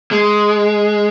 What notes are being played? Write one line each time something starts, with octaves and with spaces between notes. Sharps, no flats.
G#3